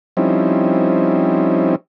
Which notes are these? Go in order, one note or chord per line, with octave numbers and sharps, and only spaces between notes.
F3 G3 C4 C#4 D#4 E4